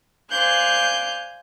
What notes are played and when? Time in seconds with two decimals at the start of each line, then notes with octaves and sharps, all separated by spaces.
0.31 C5 D5 F5 G#5 F#6 G6